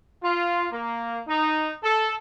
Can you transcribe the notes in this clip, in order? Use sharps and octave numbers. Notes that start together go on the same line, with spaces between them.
F4
A#3
D#4
A4